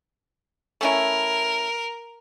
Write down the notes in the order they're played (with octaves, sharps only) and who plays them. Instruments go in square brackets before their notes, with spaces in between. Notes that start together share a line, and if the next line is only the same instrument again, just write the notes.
[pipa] A3 C#4 E4 [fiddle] A#4